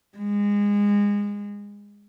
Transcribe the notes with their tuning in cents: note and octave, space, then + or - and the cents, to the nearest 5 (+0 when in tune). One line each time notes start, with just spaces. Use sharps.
G#3 -25